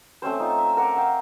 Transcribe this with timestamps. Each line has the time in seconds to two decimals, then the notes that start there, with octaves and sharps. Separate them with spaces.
0.22 A3 C4 C#4 C5
0.40 D#4 F4
0.58 E5 E6
0.77 A#4 F#5 D6
0.96 F5 G5